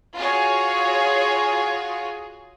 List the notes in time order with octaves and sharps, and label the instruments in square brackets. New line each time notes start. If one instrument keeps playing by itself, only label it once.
[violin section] F4 F#4 G#4 C#5